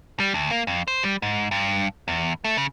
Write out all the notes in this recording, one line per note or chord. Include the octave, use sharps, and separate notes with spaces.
G3
D2
A#3
F2
C5
G3
G#2
G2
E2
A3
C#3